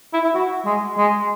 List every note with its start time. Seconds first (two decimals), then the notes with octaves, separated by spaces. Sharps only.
0.13 E4
0.24 E4
0.34 F#4
0.66 G#3
0.98 G#3